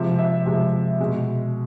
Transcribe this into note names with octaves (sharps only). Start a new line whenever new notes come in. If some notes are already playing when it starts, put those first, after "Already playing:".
Already playing: C3 F3 G#3 E5
E5
C3 F3 G#3
B2 G#3